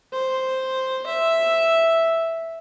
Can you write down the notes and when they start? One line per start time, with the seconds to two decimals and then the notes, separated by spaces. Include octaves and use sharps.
0.13 C5
1.06 E5